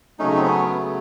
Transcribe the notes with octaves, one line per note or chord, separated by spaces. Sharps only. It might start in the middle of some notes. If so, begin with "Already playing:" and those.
C#3 F#3 A3 C#4 D#4
C4
B3 C#4
B3
B3